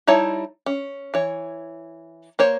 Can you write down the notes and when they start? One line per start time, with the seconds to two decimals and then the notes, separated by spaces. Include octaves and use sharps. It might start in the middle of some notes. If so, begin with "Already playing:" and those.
0.07 G3 D#4 E4 C#5 A5
0.66 C#4
1.14 E3 C#5
2.39 A#3 C5 C#5